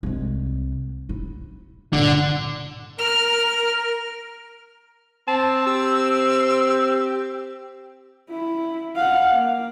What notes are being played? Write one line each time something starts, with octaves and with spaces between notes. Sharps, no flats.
C2 G#3
E4
G2 A#2 D3
A#4 F6
C4 A5
G4 E6
E4
F5 F#5
A#3